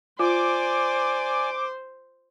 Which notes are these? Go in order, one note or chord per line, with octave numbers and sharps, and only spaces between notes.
F4 C5 D5 G#5 D6